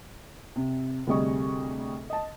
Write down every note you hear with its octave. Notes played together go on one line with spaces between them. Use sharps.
C3
D2 C3 G3 G#4 D#5 C#6
D#5 A5